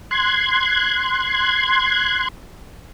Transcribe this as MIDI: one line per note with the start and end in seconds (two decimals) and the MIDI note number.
0.11 2.28 84
0.11 2.28 90
0.11 2.28 92